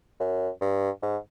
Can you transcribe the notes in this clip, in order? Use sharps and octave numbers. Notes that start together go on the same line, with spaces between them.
F#2
G2
G#2